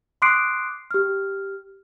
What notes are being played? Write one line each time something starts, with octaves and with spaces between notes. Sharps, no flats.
C6 D6 D#6 F#6 C7 D7
G4 F6